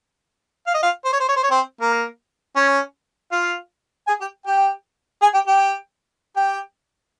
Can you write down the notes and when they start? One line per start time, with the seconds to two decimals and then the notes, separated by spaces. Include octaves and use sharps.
0.67 F5
0.74 D#5
0.83 F4 F5
1.05 C5
1.13 C#5
1.20 C5
1.28 C#5
1.36 C5
1.43 C#5
1.51 C4 C5
1.81 A#3 A#4
2.56 C#4 C#5
3.32 F4 F5
4.08 G#4 G#5
4.21 G4 G5
4.46 G4 G5
5.22 G#4 G#5
5.34 G4 G5
5.47 G4 G5
6.36 G4 G5